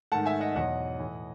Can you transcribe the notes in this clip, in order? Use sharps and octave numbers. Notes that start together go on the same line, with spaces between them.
G#2 D#3 A3 F#5 A5
E5 G#5
D#5 F#5
E2 B2 F#3 D#5 F#5
A2 E3 A3